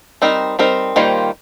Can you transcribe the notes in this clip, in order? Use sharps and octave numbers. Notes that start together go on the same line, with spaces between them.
G3 C4 D#4 A#4
G3 C4 D#4 A#4
D#3 G3 A#3 F4 C5